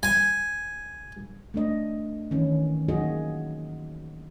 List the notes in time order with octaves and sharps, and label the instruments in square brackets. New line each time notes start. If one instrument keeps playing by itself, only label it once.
[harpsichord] G#5
[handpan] A3 D4 D#5
D#3 E3 C#4
F#3 A#3 D#4 F#4 G#4 D#5